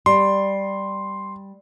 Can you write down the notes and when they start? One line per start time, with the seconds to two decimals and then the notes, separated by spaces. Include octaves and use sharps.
0.06 G3 C6